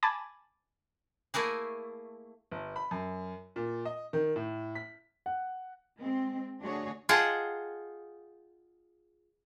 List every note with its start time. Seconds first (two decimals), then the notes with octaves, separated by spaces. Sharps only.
0.03 G#5 A5 B5 D6 G#6 A6
1.34 A3 A#3 E4 G#4
2.51 G1
2.76 B5
2.91 F#2
3.56 A#2
3.85 D#5
4.13 D#3
4.36 A2
4.75 B6
5.26 F#5
6.00 G#3 C4
6.60 D3 A3 D4 F#4 G#4 C#5
7.09 F4 G#4 D#5 F#5 G5 A5